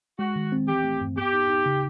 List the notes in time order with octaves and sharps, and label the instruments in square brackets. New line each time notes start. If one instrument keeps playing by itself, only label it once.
[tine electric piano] G#3 [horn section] F#4
[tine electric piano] D#3
C4
[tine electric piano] E3 [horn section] G4
[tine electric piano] A3
G2
[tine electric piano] B3 [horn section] G4
[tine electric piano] D#4
D#4
C#3